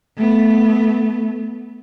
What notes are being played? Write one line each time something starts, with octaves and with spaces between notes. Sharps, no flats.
A3 B3